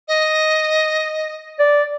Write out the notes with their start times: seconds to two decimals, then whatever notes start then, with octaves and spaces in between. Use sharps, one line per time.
0.08 D#5
1.59 D5